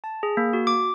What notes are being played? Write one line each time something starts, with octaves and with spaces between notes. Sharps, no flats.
A5
G#4
A#3
F#4
D6